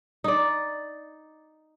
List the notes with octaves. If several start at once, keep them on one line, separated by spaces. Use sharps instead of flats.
D#4 D5